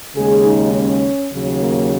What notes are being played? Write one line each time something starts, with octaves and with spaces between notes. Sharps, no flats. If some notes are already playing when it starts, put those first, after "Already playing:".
D#2 C#3 G#3 G#4
D#4
C#4
D#2 C#3 F#3
A#3